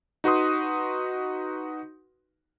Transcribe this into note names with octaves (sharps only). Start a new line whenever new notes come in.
D#4 F#4 B4 C6 D#6